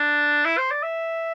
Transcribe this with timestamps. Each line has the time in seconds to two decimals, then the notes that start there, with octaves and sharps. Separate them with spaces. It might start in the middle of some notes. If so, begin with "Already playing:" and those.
Already playing: D4
0.45 E4
0.58 C5
0.71 D5
0.83 E5